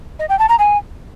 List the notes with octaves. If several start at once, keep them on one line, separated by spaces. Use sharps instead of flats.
D#5
G5
A5
A#5
G#5